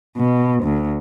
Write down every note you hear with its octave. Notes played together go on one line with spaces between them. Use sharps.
B2
D2